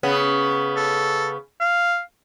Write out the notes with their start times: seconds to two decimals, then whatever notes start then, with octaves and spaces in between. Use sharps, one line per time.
0.03 C#3 B3
0.77 A4
1.61 F5